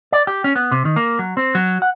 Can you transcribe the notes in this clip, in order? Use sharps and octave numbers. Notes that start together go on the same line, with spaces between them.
D5
G4
C#4
B3
C3
D#3
A#3
F#3
C4
F#3
F#5